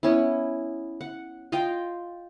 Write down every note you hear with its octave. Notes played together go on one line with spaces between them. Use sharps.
B3 C#4 E4
F#5
F4 D#5 F5 G5